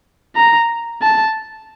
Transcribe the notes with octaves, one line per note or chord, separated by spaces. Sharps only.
A#5
A5